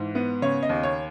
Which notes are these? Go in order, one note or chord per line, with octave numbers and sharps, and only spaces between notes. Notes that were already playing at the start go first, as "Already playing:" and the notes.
Already playing: G#2 E3
B3
C#3 C#5
D#5
D#2
C#5